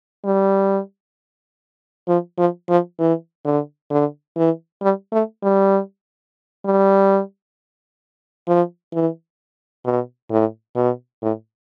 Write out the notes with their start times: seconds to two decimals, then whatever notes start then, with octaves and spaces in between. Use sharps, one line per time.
0.24 G3
2.08 F3
2.38 F3
2.69 F3
2.99 E3
3.45 D3
3.90 D3
4.36 E3
4.82 G3
5.12 A3
5.43 G3
6.65 G3
8.48 F3
8.93 E3
9.85 B2
10.31 A2
10.76 B2
11.22 A2